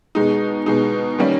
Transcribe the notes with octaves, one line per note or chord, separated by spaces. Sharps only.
B2 G#3 D#4
B2 G#3 D#4
D#3 G3 A#3 C#4